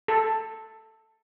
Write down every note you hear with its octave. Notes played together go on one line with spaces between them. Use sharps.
A4